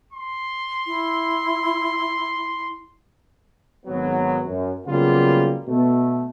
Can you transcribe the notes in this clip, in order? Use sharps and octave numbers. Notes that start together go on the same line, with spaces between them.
C6
E4
G#1 F#3 B3
F#2
C#3 F#3 G3 A#3 B3 F4
B2 A3